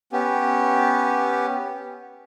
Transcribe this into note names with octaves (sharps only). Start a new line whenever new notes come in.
B3 C#4 G4